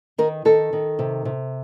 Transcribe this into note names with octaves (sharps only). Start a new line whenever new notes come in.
D#3 A#4
D#3 A4
D#3
C3
C3